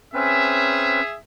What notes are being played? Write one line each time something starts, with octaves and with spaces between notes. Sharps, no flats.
C4 C#4 G#4 B4 E5